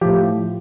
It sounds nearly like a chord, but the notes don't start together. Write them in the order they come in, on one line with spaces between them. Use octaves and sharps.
F3 G4 A2